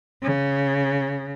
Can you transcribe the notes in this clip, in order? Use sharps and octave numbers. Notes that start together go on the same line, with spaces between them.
C#3